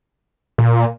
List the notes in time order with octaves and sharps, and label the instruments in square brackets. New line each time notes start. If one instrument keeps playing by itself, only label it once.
[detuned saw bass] A#2